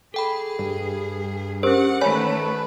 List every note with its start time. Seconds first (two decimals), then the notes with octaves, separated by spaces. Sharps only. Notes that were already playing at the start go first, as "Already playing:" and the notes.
0.14 G#4 A4 G5 B5
0.59 G2
1.63 C#4 G4 A#4 C5 F#5
2.01 D#3 A3 B4 C#5 G#5 B5